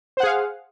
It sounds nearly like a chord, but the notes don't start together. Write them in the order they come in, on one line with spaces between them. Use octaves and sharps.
C5 F#5 G#4 F5